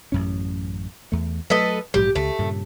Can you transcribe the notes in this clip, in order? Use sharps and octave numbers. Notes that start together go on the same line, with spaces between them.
A1 F#2 C#4
E2 A3
F#3 A3 A4 B4 D#5
A#1 G#2 F#3 G4
C#2 A3
G2 A#2 C#3